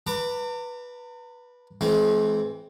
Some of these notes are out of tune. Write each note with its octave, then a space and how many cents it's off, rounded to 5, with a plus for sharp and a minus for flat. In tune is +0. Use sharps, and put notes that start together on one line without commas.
B4 -10 A#5 -45 D6 +0
E3 +0 G#3 +40 C4 +0